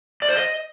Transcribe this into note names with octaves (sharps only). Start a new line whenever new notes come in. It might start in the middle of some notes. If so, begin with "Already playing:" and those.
D5
C5
D#5